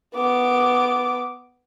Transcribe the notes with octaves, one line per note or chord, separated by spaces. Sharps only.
B3 D6